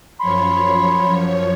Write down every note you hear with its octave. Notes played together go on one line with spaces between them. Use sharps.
F#2 F3 C#5 B5 C6